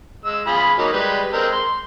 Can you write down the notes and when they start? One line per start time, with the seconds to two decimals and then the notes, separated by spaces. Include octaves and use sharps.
0.25 G#3 E6
0.47 F4 G#4 B5
0.78 F#3 A#3 D#4
0.93 G3 G#3 B4
1.33 G#3 C4 A#4
1.52 C6